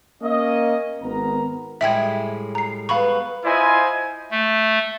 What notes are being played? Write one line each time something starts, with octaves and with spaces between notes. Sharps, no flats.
A#3 C#4 D#5
G#1 B3 A#4 A#5
A2 G3 G#3 E5 G5 G#6
A#5 C7
B3 F5 B5 C#6
E4 F4 C5 D#5 G#5
A3